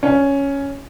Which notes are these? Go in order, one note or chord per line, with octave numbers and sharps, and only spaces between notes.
C#4